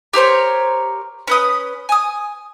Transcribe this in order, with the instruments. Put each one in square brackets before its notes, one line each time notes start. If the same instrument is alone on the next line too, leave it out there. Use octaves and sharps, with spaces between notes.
[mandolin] G4 A#4 C5 C#5
C#4 B4 D#6
G#5 D#6